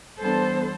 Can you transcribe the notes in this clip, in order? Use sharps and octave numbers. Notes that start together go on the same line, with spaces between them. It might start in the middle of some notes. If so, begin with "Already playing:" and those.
E3 G3 B3 D4 A4 C5